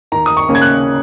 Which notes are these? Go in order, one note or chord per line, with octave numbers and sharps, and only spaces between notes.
D#2 A#5
D#6
C#6
C#3 A#3 C#4
G#6
F#6